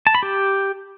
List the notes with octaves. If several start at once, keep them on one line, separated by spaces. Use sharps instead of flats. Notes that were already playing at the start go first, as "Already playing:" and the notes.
A5
B5
G4